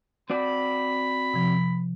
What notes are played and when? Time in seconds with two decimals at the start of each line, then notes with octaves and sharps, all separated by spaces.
0.30 C4 F#4 D5 B5
1.34 C3 F3